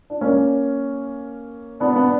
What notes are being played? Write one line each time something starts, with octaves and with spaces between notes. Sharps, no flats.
D4
A#3 C#4
B3 D4
B3 D4